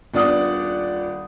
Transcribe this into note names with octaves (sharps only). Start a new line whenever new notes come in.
D#1 B3 D4 D5 F#5 D#6